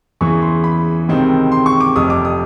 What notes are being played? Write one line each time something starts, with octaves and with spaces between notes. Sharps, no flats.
E2 C#3 E3 C#6
C6
B5
C#2 C3 D#3 G#3 C4
C6
C#6
D6
F1 F2 C3 D#6
D6
D#6